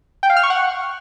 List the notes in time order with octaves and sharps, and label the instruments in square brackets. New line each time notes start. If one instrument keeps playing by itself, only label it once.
[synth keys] G5
F5
F6
C#6
F#5